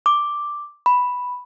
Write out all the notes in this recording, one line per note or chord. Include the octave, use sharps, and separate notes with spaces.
D6
B5